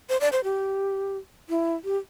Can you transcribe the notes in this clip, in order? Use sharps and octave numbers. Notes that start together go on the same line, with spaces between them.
C5
D5
C5
G4
E4
G4